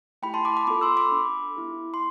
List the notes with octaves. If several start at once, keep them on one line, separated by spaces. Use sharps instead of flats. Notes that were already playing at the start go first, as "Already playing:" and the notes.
A3 E4 G4 G5 B5
A5 C6
B5 D6
B5 D6
B3 F4 A4 B5 D6
C6 E6
B5 D6
D4 A4
B3 E4 G4
C6